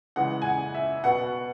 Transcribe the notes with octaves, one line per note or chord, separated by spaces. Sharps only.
C#3 E3 G#3 F#5
G#5
F#5
E5
B2 B3 F#5